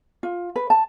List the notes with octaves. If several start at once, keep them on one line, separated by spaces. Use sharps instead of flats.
F4
B4
A5